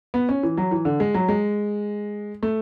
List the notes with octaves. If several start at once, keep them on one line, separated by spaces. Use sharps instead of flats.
B3
C#4
E3
F#3
E3
D3
G#3
F#3
G#3
A3